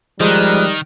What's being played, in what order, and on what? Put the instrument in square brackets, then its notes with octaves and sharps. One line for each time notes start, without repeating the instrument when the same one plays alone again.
[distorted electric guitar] D#3 [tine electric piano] F3 G#3 D#6 [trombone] G3 [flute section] A#5 F#6